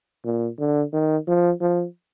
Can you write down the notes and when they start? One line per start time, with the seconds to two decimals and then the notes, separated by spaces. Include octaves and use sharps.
0.25 A#2
0.59 D3
0.93 D#3
1.28 F3
1.61 F3